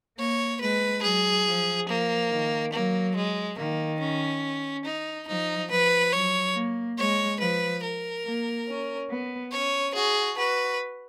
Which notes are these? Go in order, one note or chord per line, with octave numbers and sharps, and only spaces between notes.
A#3 C#5
G#3 B4
F#3 G#4
F3
F3 A#3
D#3
F#3 A#3
G#3
D#3 A#3
C#4
D#4
F3 D#4
F3 B4
F#3 C#5
A#3
G#3 C#5
F3 B4
A#4
A#3
C#4
B3
C#4 C#5
F#4 G#4
F#4 B4